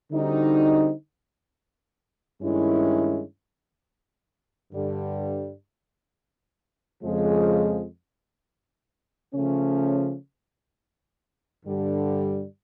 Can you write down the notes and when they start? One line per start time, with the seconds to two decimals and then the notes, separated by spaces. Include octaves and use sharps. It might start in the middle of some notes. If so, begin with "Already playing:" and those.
0.12 D3 G3 C4 D#4 F#4
2.42 G2 D#3 G#3 C#4 E4
4.73 G2 D3 G3
7.03 F2 C#3 F3 G#3
9.34 C#3 F3 A3 C#4
11.64 G2 D3 G3